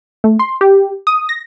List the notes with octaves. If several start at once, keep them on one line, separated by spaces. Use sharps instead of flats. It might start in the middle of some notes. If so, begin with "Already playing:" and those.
A3
C6
G4
D#6
A#6